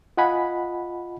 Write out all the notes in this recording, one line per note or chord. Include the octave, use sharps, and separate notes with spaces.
F4 D#5 F#5 G#5 B5